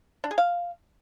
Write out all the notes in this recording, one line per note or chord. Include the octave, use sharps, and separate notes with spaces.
D4
G#4
F5